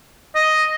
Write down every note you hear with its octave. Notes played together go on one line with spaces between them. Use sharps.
D#5